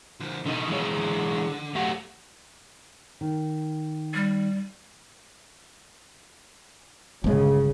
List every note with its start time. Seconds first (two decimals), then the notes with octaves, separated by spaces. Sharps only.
0.20 D3 F3
0.46 B2 D3 D#4
0.69 E3 G#3 C#5
0.97 D3
1.75 F#3 A3 G4 F#5
3.21 D#3
4.14 G3
7.24 G1 C#3 G#3